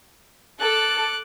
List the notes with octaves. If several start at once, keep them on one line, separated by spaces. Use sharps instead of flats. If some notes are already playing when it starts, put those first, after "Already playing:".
A4 D6 F#6